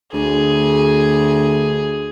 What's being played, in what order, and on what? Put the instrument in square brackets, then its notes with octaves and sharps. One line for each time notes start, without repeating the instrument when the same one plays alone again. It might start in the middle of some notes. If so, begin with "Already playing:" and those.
[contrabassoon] D2 [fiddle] G#4